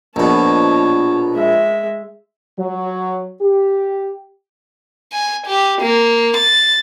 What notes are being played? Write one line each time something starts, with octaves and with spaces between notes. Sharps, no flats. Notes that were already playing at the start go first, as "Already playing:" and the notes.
A#1 B2 C#5 A5
G#3 E5
F#3
G4
G#5
G4
A#3
A6